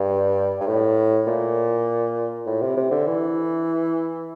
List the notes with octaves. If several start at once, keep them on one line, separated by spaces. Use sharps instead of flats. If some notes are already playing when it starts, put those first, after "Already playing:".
Already playing: G2
G2
A2
A#2
A2
C3
C3
D3
E3